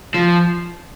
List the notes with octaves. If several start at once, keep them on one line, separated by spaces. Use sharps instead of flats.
F3